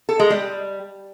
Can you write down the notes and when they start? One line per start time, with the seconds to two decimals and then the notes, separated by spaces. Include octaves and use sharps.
0.09 A4
0.20 G#3
0.30 G3